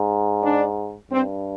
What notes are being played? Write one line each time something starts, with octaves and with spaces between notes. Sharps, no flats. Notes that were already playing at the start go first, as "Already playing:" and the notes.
Already playing: G#2
D4
G2 C4